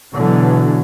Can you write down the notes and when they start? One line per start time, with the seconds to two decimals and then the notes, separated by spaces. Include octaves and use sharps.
0.14 B2 D3 E3 F#3